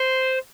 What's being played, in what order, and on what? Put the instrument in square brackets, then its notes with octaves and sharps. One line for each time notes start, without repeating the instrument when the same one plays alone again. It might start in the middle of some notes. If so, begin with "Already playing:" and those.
Already playing: [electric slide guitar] C5